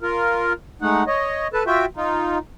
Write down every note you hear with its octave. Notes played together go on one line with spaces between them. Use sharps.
F4 A#4
G#3 A3 D#4 F#5
C#5 D#5
A4 B4 A5
F4 F#4 E5 G5
D#4 F4